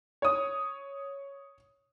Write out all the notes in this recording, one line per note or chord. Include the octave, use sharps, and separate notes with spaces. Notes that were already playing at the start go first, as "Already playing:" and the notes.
C#5 D#6